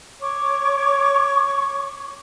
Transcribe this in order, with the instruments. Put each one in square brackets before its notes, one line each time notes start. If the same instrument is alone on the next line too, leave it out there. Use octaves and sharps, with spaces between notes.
[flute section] C#5 C#6 D6